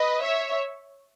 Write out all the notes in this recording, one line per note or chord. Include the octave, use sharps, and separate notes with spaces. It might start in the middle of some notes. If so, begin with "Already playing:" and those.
Already playing: B4 D#5
C#5 E5